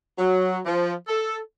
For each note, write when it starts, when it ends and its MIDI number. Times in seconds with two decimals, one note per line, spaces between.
0.18 0.59 54
0.66 0.94 53
1.08 1.37 69